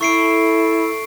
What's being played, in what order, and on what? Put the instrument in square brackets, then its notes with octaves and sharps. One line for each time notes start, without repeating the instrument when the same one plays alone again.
[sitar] A3 [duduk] E4 [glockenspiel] C#6 C7 D7